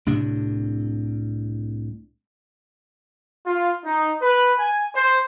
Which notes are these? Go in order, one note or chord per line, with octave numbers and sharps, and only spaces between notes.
C2 A2 C3 D4
F4
D#4
B4
G#5
C5